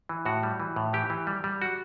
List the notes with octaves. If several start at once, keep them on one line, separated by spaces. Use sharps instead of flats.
E3
A2 F#4
G3
E3
A2
E3 G4
E3
G3
G3
F#4